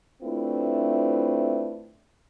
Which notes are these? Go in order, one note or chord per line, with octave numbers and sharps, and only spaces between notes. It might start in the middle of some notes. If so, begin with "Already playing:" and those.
A3 C4 D4 E4 F4 B4